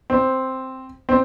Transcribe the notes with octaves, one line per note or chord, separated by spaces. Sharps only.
C4
C4